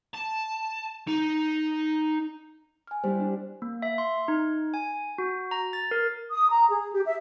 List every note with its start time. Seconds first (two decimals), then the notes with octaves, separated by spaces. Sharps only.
0.14 A5
1.08 D#4
2.87 G#5 F6
3.04 G3 E4 G4 C5
3.19 D4
3.62 A#3
3.82 E5
3.98 C6
4.28 D#4
4.74 G#5
5.18 F#4
5.51 A#5
5.73 A6
5.91 A#4
6.31 D#6
6.50 A#5
6.70 G#4
6.91 G4
7.06 E5